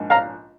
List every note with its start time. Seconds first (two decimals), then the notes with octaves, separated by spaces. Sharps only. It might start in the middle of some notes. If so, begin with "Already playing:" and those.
Already playing: A#1 G#2
0.10 F5 A#5